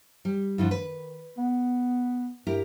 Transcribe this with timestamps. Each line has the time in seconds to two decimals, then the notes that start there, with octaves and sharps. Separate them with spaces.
0.25 G3
0.58 G2 D3 F3 E4
0.71 D#3 B4
1.38 B3
2.47 G2 E4 G4 A#4